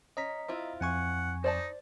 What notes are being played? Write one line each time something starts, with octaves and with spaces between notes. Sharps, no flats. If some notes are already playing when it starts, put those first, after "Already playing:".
C#4 D#5 A#5 B6
C4 E4 F4
F2 F#5 G#5 C#6
D#4 C5 D5 A5